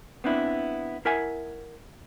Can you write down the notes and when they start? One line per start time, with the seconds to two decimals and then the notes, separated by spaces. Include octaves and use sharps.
0.24 B3 C4 D4 E4
1.05 E4 A#4 E5 F#5 G#5